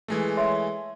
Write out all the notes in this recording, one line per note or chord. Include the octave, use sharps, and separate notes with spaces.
E3 G#3 A3
C#5 E5 C6